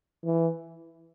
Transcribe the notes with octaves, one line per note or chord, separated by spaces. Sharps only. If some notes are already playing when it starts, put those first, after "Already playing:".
E3